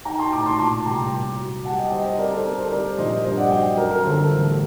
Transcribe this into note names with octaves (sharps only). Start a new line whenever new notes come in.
D#4 G5 A#5
A5 C6
A2 A#5 D6
A5 C6
A#2 A5 C6
C2 G5 A#5
A#3
F#3
G3 F#5 A5
D#5 G5
G3 C5 D#5
C5 D#5
C4 A#4 D5
A4 C5
C4 A#4
A4 C5
G3 A#4 D5
A#1 C5 D#5
G2 C5 D#5
D5 F#5
F#3 D#5 G5
F#2 A#4
A#4
G1 A4 C5
A4
A1